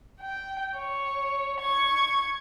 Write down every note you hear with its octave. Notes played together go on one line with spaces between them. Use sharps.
G5
C#5
C#6 G#6